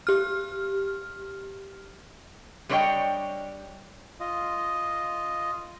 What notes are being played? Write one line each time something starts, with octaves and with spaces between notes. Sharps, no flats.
G4 F6
G3 D4 B4 C#5 D#5 G5
F4 D#5